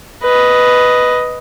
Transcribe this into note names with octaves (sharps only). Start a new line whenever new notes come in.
B4 D#5